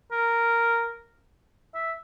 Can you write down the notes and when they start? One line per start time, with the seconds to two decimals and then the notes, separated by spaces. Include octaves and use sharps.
0.12 A#4
1.75 E5